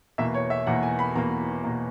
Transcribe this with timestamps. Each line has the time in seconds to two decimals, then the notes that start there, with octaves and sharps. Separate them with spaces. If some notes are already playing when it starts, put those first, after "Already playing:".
0.18 E2 B2 A#3 E5
0.34 C#5
0.50 E5
0.67 E2 B2 A#3 F#5
0.83 G#5
0.99 B5
1.15 E2 B2 A#3 A#5
1.64 B2 A#3